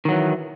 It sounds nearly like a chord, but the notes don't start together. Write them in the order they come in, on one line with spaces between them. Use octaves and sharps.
D#3 F#3 E3